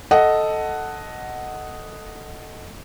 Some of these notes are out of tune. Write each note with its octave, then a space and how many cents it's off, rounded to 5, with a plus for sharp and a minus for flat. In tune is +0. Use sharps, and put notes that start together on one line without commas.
A4 +0 D#5 +0 F#5 +5